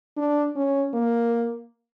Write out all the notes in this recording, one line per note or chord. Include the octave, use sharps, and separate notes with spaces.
D4
C#4
A#3